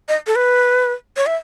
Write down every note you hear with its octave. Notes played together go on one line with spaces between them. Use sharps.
D#5
A4
B4
C#5
E5